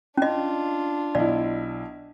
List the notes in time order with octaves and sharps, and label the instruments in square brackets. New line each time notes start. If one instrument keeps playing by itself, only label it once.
[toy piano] C#4 D#5 [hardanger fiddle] D4 F4
[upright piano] B1 E4 [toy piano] D5